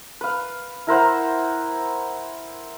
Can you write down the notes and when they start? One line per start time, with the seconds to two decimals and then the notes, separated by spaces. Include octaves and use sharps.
0.21 B4 F5
0.87 E4 A#4 C5 F#5